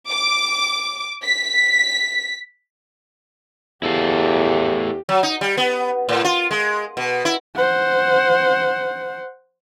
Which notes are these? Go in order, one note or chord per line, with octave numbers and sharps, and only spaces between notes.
D6
B6
E2 E4 G4 A4 F5
F#3
D#4
G3
B3
A2
F4
G#3
B2
E4
C5 F#5